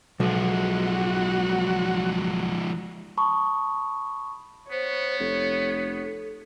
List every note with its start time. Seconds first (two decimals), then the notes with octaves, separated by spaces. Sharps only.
0.20 B1 F3 G#3 F#4 F#5
3.18 A5 B5 C#6 D#6
4.72 B3 C5 C#5
5.20 F1 A4